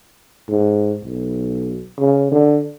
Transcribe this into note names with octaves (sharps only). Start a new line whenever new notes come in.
G#2
B1
C#3
D3